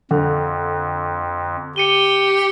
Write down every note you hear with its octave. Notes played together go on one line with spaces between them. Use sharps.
F2 D3
G4 C#7 D#7 G7